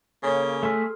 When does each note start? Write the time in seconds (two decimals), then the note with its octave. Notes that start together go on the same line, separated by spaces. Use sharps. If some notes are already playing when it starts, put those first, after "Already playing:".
0.23 C#3 A#3 A4 C#5 G#5
0.63 A3 G#4 A4 E5 C6 F6